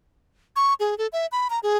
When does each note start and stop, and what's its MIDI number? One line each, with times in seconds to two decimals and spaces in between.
0.56 0.74 85
0.80 0.97 68
0.98 1.07 69
1.13 1.26 76
1.32 1.48 83
1.50 1.59 82
1.63 1.77 68